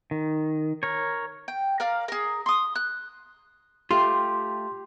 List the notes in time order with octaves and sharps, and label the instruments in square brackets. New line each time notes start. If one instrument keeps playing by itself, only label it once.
[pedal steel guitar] D#3
A#4 C#5
[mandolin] G5
A#4 D5 F5
G#4 A#4
C6 D#6
F#6
[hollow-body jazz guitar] A3 F4 [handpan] G4 [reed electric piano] C6